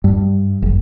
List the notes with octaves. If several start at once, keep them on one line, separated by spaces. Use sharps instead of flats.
G2
F#1